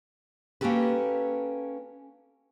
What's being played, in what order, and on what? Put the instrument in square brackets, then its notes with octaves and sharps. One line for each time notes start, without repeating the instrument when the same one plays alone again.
[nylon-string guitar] A#3 C#4 F#4 G4 A4 B4